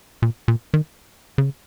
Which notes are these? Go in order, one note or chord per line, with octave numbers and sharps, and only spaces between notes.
A#2
A#2
D#3
C#3